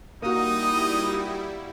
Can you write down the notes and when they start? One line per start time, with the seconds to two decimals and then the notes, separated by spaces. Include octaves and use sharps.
0.22 G3 A#3 D#4 E4 F#4 D#6